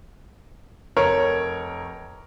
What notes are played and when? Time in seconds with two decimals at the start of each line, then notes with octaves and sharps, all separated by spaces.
0.96 F1 A#4 C#5